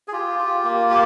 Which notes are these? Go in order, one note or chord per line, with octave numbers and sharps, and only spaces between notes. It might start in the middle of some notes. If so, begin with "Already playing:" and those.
G#4
F4 G4
F4
A#3
G4